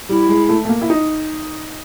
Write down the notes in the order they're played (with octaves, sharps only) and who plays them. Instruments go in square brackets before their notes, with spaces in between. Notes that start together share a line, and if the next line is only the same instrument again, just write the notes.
[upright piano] G3 [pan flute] E4
[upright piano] G#3
A3
A3
A#3
E4
D#4